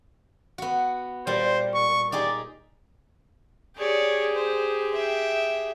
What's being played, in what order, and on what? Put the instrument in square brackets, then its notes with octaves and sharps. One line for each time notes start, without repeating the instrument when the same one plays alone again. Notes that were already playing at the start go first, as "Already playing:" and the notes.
[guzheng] B3 F#4
[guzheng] A#2 G3 [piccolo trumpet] C5
[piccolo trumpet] C#6
[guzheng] D#4 G4 G#4 [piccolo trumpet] D5
[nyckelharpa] G4 G#4 [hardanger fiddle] C#5 D5
[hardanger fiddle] C5
E5 G5